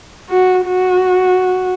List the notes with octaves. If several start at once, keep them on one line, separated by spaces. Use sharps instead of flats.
F#4
F#4